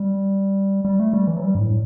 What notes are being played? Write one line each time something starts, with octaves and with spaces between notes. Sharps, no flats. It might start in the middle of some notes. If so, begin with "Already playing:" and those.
Already playing: G3
G3
A3
G3
E3
F#3
G3
G2
A2